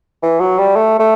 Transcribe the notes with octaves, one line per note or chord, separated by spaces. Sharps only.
E3
F#3
G3
A3
A3